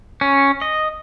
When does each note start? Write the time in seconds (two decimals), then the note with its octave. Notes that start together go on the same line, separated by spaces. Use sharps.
0.21 C#4
0.61 D#5